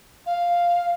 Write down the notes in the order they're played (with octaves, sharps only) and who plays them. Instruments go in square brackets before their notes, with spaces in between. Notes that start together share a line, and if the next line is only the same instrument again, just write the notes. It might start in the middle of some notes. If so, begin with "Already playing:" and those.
[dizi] F5